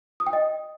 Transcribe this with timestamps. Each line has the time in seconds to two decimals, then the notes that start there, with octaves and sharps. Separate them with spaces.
0.20 D#6
0.27 G5
0.33 D#5